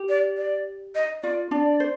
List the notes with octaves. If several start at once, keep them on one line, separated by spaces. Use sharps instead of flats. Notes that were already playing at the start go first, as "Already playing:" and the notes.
Already playing: G4
D5
D5
D#5
F4 D5
D4 D5
C5